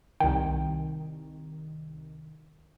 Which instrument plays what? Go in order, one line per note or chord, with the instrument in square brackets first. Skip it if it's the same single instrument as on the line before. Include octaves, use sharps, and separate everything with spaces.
[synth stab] C2 D#3 [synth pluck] G5